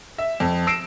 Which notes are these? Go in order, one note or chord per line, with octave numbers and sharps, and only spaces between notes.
E5
F2
E6 A#6 C7 D7 E7